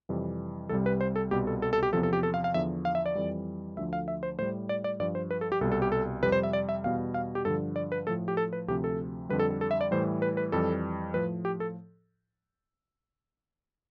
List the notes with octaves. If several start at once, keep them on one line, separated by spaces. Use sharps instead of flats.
F2 C3 E3 G3
C2 C3 G3 A4
B4
C5
A4
C2 B2 G3 G4
A4
A4
A4
G4
E2 C3 F3 A4
A4
G4
A4
F5
F5
E2 D3 F3 E5
F5
E5
D5
F2 E3 G3
D2 D3 F3 E5
F5
E5
C5
A2 G3 C5
D5
D5
G2 F3 D5
C5
B4
A4
G4
C2 B2 G3 A4
A4
G4
A4
F2 C3 G3 B4
C5
E5
D5
E5
E2 B2 G3 F5
F5
G4
G2 D3 F3 A4
D5
B4
A2 F3 A4
G4
A4
B4
D2 C3 F3 G4
A4
F2 D3 G3 B4
A4
A4
A4
E5
D5
A2 E3 G3 C5
B4
B4
F2 E3 G3 A4
A2 F3 B4
G4
A4